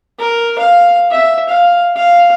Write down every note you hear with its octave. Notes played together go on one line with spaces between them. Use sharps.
A#4
F5
E5
F5
F5